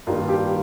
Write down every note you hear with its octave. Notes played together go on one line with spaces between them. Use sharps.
G2 D#3 G3 A#3 F4
G4